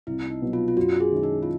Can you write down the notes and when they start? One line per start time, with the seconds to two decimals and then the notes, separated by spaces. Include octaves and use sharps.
0.07 C2 E4
0.30 D#4
0.42 B2 F#3 B3
0.53 F4
0.68 F4
0.77 F#2 F#4
1.00 G#4
1.11 D#3 G#3 C#4 E4
1.23 D#4
1.43 F4